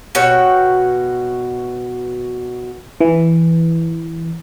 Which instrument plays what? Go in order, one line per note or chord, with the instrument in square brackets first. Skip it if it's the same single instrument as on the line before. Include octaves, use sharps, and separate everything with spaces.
[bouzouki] B2 F#4 C#5 G5
[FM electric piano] E3